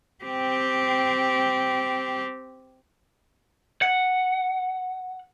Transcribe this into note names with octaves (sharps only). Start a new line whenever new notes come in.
C4 G4
F#5